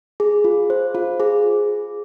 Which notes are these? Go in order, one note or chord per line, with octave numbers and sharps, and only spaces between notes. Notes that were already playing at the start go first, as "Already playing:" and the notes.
G#4
F4
C5
F4
G#4